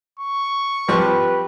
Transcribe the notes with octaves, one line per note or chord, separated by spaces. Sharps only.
C#6
F3 G3 C4 G4 B4